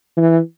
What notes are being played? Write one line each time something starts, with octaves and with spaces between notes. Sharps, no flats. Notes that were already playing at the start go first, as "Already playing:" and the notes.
E3